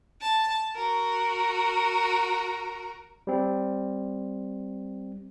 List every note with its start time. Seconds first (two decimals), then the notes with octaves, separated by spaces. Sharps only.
0.21 A5
0.75 F#4 A#4
3.27 G3 C4